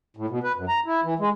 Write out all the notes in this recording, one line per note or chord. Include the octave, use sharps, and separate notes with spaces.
A2
B2
B4
F#2
A#5
E4
E3
G#3